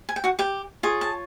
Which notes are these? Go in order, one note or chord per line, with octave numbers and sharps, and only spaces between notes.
G#5
G5
F#4 F#5
G4 G5
F4 G#4 C#5
A5